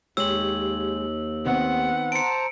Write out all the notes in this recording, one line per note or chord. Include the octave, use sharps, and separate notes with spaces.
D#2 G#3 G4 C#5 E6 F#7
D#3 B3 C4 F#5
C5 A5 A#5 C#7 D7